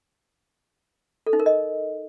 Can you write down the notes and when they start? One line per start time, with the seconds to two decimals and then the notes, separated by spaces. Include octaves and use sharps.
1.27 A4
1.33 D#4
1.40 A#4
1.46 D#5